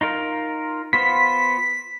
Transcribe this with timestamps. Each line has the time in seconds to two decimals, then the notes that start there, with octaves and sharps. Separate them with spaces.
0.01 D#4 F4 A#4
0.93 B3 F4 C5 B6